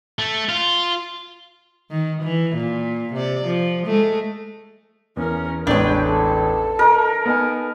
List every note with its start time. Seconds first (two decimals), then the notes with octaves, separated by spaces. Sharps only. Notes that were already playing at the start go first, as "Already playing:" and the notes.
0.19 A3
0.49 F4
1.90 D#3
2.23 E3
2.56 A#2
3.14 C3 D5
3.46 F3
3.86 G#3 A3
5.17 E2 C#4 A#4
5.67 A1 E2 G#3 D4 B4 C#5 G5
6.02 A4
6.79 A#4 D#5 A#5
7.26 B3 D#4 G#5